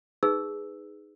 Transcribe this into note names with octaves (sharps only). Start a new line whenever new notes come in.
D#4 G#4 B4 E6